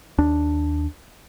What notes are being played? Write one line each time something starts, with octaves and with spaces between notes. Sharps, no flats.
D#2 D4